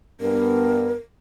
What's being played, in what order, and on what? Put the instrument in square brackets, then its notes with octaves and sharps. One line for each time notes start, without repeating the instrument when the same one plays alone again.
[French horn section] G2 B3 [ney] A#4